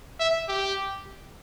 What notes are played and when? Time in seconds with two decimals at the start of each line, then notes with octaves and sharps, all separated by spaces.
0.19 E5
0.48 G4